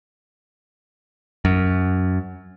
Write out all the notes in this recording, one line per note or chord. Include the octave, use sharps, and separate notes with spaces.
F#2